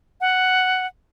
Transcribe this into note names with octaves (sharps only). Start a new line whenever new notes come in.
F#5